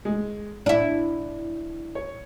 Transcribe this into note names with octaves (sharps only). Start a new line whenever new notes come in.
G#3
A2 D4 E4
C#5